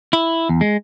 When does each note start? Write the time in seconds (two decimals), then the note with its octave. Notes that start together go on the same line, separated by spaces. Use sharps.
0.13 E4
0.49 E2
0.61 G#3